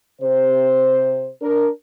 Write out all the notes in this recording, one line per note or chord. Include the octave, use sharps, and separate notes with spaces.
C3 C5
D4 A#4